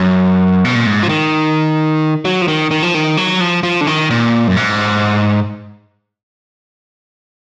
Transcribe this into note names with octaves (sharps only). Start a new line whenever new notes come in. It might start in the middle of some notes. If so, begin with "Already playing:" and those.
Already playing: F#2
B2
A#2
G#2
F3
D#3
F#3
F3
D#3
D#3
F3
D#3
F#3
F3
F3
D3
D#3
A#2
F#2
G#2